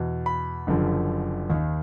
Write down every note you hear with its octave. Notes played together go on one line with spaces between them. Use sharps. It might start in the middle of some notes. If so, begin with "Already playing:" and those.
Already playing: E2 B2
B5
F#1 F#2 D3 F3
D#2 D#3